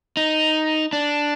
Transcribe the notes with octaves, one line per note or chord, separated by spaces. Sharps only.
D#4
D4